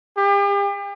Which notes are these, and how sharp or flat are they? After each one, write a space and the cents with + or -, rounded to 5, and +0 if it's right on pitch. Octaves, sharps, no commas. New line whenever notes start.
G4 +40